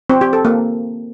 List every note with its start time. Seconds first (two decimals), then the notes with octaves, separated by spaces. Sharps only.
0.10 C4
0.21 G4
0.33 A4
0.45 A#3